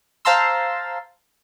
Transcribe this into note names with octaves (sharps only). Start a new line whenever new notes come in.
C5 F5 A5 A#5 C6 E6